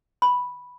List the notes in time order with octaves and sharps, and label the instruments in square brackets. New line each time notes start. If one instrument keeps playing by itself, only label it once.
[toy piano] B5